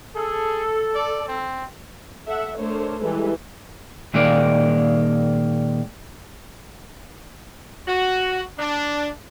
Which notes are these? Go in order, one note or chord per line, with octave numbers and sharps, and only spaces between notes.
G#4 A4
D5
C4
A4 E5 F#5
A3 D4 A#4 C5 C#5
E3 G3 G#3 G4 A4 B4
A#2 D#3 G#3 A#3 D5
F#4
D4